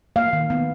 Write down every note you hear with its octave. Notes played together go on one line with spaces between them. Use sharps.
A#3 F5
D#3
B3